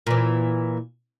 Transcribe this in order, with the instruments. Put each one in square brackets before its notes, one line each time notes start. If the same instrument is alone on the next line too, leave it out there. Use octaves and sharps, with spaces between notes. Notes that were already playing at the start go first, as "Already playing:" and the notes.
[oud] A#2 E3